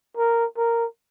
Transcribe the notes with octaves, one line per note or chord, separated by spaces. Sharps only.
A#4
A#4